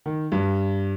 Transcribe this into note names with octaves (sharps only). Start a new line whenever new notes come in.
D#3
G2